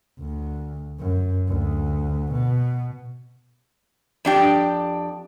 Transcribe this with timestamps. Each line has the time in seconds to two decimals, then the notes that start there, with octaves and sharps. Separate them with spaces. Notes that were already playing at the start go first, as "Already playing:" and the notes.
0.19 D2
0.99 F#2
1.48 D2
2.32 B2
4.25 F2 D4 G4